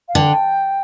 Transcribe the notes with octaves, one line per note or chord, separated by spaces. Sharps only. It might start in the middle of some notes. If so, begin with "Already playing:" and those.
F5
D3 G5